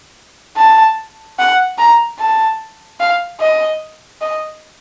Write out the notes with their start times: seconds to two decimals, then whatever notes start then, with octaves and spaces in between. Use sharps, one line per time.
0.57 A5
1.39 F#5
1.78 A#5
2.19 A5
3.00 F5
3.40 D#5
4.21 D#5